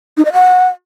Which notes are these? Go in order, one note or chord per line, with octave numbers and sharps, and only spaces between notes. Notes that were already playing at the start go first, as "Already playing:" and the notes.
D#4
D#5
F#5